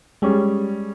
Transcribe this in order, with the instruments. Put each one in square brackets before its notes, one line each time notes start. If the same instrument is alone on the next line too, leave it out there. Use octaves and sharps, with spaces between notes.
[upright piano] G3 C#4 G#4 [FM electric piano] G#3